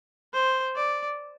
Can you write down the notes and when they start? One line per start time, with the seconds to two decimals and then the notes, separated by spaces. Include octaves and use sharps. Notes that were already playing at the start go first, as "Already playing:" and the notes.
0.33 C5
0.75 D5